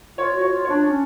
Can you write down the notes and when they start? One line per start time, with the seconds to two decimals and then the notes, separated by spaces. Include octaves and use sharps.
0.18 F4 C#5
0.35 F#4
0.42 C#5
0.53 F4
0.65 C#5
0.70 D4
0.88 C#4